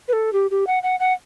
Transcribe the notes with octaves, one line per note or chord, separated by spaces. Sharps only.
B4
A4
G4
G4
F#5
F#5
F#5